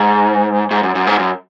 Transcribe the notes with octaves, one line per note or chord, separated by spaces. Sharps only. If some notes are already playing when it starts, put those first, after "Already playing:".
Already playing: G#2
G#2
F#2
F#2
G#2
F#2